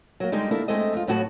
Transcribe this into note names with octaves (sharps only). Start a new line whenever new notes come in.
F#3 A#3
D3 G3 G#3 D#4 G4
A#3 D4 E4 A4 A#4
G#3 A3 C4 A4 D#5
F2 F4
F2 A2 F#3 F#4 A4 A5